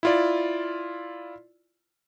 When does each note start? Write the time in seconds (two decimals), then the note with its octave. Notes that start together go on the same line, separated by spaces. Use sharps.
0.03 E4 F4 D5